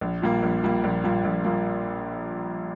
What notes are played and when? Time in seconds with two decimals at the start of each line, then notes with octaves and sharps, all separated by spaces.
0.01 A#1
0.22 A#2 G3 A#3
0.43 A#1
0.63 A#2 G3 A#3
0.84 A#1
1.04 A#2 G3 A#3
1.24 A#1
1.44 A#2 G3 A#3